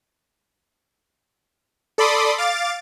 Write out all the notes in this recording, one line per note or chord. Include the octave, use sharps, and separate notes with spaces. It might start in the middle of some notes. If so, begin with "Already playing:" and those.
A4 D5 B5 C6 D6 D#6
F5 D6 A6